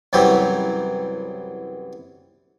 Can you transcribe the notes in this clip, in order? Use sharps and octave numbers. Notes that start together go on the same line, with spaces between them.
C2 F#2 E3 F#3 G4